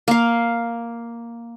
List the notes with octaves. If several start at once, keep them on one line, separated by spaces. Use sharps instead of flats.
A#3 F5